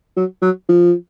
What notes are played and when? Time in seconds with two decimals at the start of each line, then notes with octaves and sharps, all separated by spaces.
0.17 F#3
0.42 F#3
0.69 F3